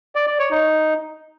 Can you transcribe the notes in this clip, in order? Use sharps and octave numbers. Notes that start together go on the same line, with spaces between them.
D5
D5
C#5
D#4